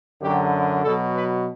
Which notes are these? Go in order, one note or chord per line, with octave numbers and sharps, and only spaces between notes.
F#2 D3 F#3 G4
B2 F#3 A4
B4